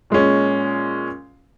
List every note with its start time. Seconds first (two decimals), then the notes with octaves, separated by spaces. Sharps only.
0.10 A#2 G#3 C#4